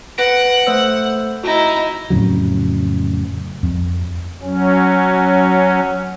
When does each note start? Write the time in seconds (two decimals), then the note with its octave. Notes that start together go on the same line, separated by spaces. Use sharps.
0.18 B4 F#5 A#6 D7
0.67 A3 C5 E6
1.44 D#4 E4 F#4 A#6
2.10 F2 A2 C#3 F#3
3.63 F2
4.43 F#3 C#4